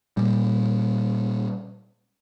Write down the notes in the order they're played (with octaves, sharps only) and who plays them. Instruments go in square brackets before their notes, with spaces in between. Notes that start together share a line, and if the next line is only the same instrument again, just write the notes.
[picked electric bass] A#2 G3